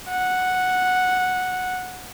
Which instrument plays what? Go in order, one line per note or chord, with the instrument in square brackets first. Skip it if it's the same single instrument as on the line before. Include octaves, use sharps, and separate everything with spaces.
[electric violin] F#5